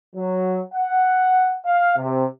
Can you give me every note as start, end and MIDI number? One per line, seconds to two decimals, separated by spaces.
0.14 0.60 54
0.74 1.57 78
1.65 1.96 77
1.96 2.25 48